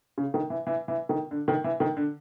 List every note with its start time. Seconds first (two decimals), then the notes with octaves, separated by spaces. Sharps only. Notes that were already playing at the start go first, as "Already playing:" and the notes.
0.18 C#3
0.34 D#3
0.50 E3
0.67 E3
0.88 E3
1.09 D#3
1.31 D3
1.48 D#3
1.64 E3
1.80 D#3
1.97 D3